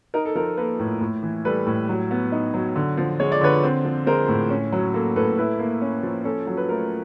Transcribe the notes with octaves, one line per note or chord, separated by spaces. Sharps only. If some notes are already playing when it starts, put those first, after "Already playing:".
D#4 A#4
A4
F3 A#4
A#3 A4 B4
A2
A2
E3
G3 A4 B4
A2
F#3
B3
D#4
F#3
D3
F3
G#3 C#5
D5
D3 B4 C#5
C4
F3
G#3 A#4 C5
A2
C#4
F#3
A#3 A4
A2 A4 B4
E4 A4 B4
A#3
C#4
F3
C#4 A4
F#3
B4
A3 A#4